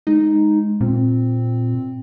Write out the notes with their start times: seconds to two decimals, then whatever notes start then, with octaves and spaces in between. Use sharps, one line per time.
0.07 G#3 D#4
0.81 A#2 C4